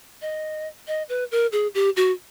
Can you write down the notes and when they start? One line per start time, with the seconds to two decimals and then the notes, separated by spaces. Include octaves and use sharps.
0.22 D#5
0.87 D#5
1.09 B4
1.31 A#4
1.52 G#4
1.74 G4
1.97 F#4